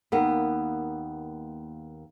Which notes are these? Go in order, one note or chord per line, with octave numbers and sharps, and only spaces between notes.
D#2 A#3 B3